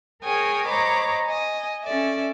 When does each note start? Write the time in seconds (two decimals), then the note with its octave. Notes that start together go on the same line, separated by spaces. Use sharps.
0.22 G#4 A#4 C#5 G5 G#5 D#6
0.67 C5 C#5 D#5 A#5 B5 D6
1.25 D#5 G#5
1.83 C#4 A4 D5 E5